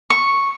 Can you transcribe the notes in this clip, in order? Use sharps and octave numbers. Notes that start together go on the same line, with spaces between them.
C#6